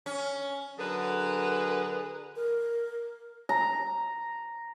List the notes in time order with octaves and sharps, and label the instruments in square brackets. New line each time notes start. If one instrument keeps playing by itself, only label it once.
[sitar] C#4
[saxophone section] D3 F#3 G#4 A#4 B4
[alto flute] A#4
[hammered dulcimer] A#5